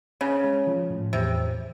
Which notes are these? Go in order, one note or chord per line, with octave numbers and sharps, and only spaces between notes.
C#3 C#4
G#3
F3
A2
E2 C3